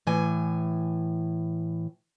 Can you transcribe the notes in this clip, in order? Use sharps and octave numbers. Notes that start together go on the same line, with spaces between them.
A2 E3 G#5